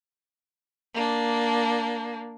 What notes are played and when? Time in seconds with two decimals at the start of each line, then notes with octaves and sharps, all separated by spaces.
0.94 A#3 D4